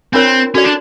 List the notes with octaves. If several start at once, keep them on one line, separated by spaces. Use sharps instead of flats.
C4 D4 F4 A#4 C#5
C#4 F#4 A4 D5
D4